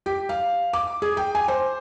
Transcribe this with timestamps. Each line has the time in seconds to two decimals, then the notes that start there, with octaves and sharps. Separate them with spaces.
0.06 G4
0.29 F5
0.73 D6
1.02 G#4
1.17 G5
1.35 G#5
1.48 C5